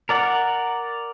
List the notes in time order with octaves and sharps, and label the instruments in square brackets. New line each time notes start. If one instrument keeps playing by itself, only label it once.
[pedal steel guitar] A#4 D5 F#5